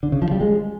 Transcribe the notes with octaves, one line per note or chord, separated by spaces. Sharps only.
D3
C#3
F3
G3
G#3